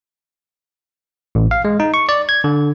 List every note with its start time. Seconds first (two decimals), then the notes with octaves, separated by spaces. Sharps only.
1.35 A1
1.51 F5
1.65 G#3
1.80 D#4
1.94 C#6
2.09 D5
2.29 G#6
2.44 D3